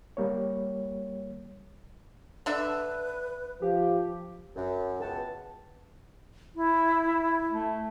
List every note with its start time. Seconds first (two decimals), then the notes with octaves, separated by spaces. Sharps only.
0.17 G3 A#3 C#5
2.46 D3 D4 B4 E5
3.62 F3 G4
4.56 F#2
5.01 C#2 B3 F#4 G5 A5
6.56 E4
7.51 A3